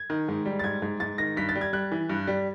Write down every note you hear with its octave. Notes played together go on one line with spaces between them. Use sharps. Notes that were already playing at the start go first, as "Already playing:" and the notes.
Already playing: G#6
D#3
G#2
G3
A6
G#2 G#6
G#2
G#2 A6
D#3 A#6
G2 B6
A6
G3
G#6
G3 F#6
E3
G2
G3